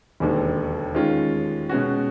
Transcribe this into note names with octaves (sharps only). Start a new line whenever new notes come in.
E1 D#2 D3
D#3 G#3 C#4 F4
B2 G#3 C#4 F#4